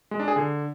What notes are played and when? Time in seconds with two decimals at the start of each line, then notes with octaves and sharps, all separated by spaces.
0.11 G#3
0.20 D4
0.28 G#4
0.36 D3